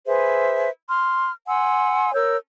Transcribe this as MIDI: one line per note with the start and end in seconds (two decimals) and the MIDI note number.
0.07 0.69 68
0.07 0.69 71
0.07 0.69 72
0.07 0.69 76
0.89 1.32 84
0.89 1.32 89
1.47 2.14 78
1.47 2.14 80
1.47 2.14 84
1.47 2.14 88
2.14 2.37 70
2.14 2.37 73
2.14 2.37 88
2.14 2.37 91